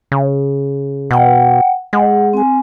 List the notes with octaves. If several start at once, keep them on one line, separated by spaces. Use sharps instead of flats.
C#3
B2 F#5 G5
G#3 F#5
C4 G#5